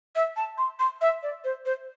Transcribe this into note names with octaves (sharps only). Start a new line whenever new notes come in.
E5
A5
C6
C6
E5
D5
C5
C5